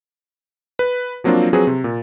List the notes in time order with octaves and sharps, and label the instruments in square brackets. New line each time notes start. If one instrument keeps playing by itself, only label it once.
[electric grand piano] B4
F3 F#3 A#3 C4 D4 F4
F3 F#3 C4 G#4 B4
C3
A#2